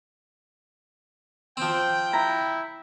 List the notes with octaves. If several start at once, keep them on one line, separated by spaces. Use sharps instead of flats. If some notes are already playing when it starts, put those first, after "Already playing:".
F3 C4 G5
E4 A#5